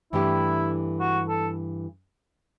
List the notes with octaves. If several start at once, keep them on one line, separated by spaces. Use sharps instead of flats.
G2 E3 A3 D4 E4 G4
F#4
A4